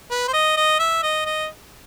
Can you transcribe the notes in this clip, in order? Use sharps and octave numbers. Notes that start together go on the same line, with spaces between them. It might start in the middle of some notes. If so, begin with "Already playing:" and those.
B4
C5
D#5
D#5
E5
D#5
D#5